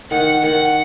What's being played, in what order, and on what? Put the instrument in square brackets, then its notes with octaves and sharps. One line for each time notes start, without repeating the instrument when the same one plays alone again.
[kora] D#3 [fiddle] F#5
[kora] D#3 [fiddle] F#5